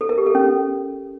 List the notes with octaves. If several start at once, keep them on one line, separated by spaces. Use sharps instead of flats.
A4
A#4
G4
A4
C#4